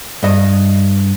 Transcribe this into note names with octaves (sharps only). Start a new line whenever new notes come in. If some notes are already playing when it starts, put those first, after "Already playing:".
G2 D#5